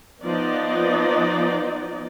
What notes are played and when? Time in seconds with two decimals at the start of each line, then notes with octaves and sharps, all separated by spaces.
0.22 F3 B3 D#4 D5 D#5